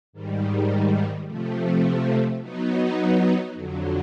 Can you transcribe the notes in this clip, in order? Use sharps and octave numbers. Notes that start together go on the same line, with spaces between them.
G#2 D#3 G3
C3 F3 A3
F#3 B3 D#4
F2 D3 F#3